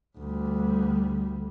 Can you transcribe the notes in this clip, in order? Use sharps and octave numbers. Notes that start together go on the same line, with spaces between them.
D2 G3